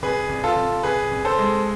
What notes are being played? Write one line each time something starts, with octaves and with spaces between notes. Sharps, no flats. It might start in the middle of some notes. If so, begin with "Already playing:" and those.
C2 G#4 B4
C2
F4 A4
C2
C2 G#4 B4
C2
A4 C5
G#3